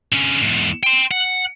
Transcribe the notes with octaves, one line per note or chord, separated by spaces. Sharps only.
D3 C#4
E2 G#2
G5 C6
F#5